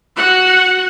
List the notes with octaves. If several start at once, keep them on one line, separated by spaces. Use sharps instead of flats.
F#4 F#5